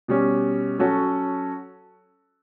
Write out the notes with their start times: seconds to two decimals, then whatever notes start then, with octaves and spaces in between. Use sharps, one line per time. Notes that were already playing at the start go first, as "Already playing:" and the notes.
0.08 B2 G3 C#4
0.79 F#3 C#4 F#4 A4 C#5